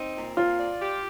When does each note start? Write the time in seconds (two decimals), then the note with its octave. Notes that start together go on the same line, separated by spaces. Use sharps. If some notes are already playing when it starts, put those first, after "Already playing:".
Already playing: C4 D#4
0.15 A#2
0.37 C4 F4
0.59 D5
0.81 G4